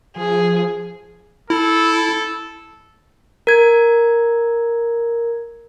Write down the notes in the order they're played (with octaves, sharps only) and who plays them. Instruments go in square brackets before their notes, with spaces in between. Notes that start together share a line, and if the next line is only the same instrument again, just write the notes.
[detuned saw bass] F3 [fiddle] G#4
[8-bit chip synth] E4 [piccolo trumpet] A4
[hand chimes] A#4 G#6